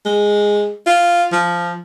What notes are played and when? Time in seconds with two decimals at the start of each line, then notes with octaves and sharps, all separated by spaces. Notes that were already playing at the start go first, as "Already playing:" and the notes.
0.06 G#3
0.87 F4
1.32 F3